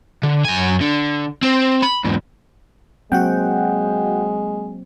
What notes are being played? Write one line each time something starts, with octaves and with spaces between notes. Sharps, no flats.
D3
F#2 G#5
D3
C4
B5
E2 G#2
F#3 G#3 A#3 C4 F#4 F#5 G5